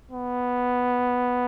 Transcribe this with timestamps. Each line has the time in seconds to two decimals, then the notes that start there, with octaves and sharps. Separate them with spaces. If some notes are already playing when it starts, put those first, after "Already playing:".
0.11 B3